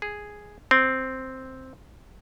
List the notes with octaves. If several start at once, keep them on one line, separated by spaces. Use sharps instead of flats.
G#4
C4